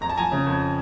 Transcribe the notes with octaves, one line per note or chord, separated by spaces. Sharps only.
F2 A#5
A5
F3 G#5 A#5
C#3
F2